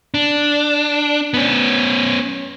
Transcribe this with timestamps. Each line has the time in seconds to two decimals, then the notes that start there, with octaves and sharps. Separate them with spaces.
0.14 D4
1.34 B3 C#4